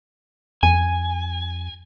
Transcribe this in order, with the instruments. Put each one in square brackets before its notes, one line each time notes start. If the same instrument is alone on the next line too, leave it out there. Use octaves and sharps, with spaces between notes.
[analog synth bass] F2 [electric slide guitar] G#5